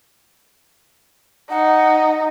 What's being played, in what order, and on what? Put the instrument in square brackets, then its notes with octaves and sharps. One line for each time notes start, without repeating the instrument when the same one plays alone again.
[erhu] D#4 [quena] F#5